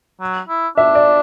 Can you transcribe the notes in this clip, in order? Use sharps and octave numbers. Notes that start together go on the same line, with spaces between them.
F#3
E4
D4 E5
D5